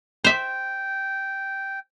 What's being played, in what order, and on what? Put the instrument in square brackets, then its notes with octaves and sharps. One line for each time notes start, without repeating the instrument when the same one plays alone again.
[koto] C5 E5 [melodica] G5